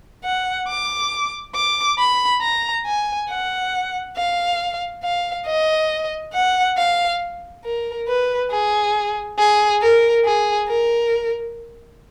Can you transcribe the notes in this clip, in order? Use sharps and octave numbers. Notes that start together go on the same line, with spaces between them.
F#5
D6
D6
B5
A#5
G#5
F#5
F5
F5
D#5
F#5
F5
A#4
B4
G#4
G#4
A#4
G#4
A#4